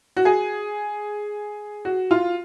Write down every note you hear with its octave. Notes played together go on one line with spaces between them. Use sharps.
F#4
G#4
F#4
F4